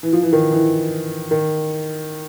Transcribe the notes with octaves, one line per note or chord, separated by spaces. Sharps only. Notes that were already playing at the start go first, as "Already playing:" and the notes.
E3
F3
E3
D#3
E3
D#3